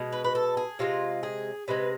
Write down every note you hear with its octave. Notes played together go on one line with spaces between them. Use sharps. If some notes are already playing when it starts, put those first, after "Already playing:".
Already playing: B2 G#3
B4
B4
A4
G#4
C3 G#3 F4
G#4
C3 G#3 B4